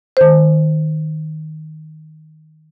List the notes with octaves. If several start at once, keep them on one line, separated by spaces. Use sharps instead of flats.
D#3 C5